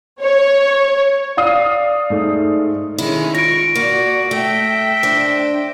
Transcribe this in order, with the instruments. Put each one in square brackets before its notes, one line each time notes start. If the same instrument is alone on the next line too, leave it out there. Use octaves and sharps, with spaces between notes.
[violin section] C#5
[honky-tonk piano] D5 F5 D#6
[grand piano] G#2 A3
[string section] D#3 G#3 C#4 [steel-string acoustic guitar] E4
[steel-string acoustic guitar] F4 [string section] C#6 [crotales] A#6 D7
[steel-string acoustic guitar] A#3 [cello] F#4 [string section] D5
[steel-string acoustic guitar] A3 [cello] E5 [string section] G5
[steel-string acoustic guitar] D4 C5